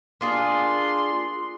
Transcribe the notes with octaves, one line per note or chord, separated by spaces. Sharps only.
A#3 D4 F4 G#4 C6